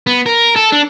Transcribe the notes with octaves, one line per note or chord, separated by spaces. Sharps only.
B3
A#4
A4
D4